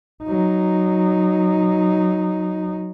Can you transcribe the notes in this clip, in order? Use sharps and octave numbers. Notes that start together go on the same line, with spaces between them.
F#3 D#4